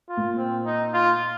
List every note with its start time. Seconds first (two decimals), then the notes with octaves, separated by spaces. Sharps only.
0.09 F4
0.17 A#2
0.37 C4
0.66 D#4
0.93 F4